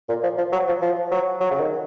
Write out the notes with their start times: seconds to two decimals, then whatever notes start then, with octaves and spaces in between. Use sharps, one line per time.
0.09 A#2
0.23 F3
0.38 F3
0.52 F#3
0.68 F3
0.82 F3
1.12 F#3
1.41 F#3
1.51 C#3
1.60 D#3